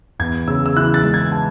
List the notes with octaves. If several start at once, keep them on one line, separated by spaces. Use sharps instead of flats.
E2 G#6
C#3 E6
E6
E3 F#6
A6
G#3
G#6
A5